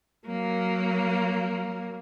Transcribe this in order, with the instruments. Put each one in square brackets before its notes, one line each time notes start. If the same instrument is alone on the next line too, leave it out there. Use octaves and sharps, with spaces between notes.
[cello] F#3 A#3